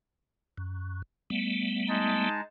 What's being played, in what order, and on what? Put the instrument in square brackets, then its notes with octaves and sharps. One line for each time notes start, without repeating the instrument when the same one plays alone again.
[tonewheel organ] F#2
G3 A3 B3
[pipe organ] G#3 D#4 A5